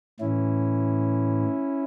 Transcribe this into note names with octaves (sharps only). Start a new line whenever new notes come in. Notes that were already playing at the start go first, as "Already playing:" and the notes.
A2 E3 C#4 E4